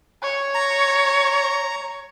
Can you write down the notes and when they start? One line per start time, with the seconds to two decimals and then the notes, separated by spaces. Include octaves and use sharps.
0.23 C#5
0.55 A#5